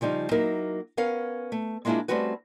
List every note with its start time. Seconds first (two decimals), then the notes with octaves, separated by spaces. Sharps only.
0.01 C#3 F3 G3 D#4
0.31 F#3 A#3 D#4 E4 A#4
0.97 B3 C#4 A#4 F5
1.52 A3
1.85 G#3 A#3 D4 E4 F4 G#4
2.08 G3 A3 C4 C#4 F#4 B4